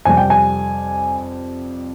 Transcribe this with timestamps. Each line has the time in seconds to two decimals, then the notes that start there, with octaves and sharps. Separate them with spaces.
0.05 F2 C3 G3 G#5
0.17 G5
0.30 G#5